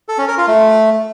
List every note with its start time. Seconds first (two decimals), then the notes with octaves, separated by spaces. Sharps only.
0.08 A4
0.18 C#4
0.28 A#4
0.38 F4
0.48 A3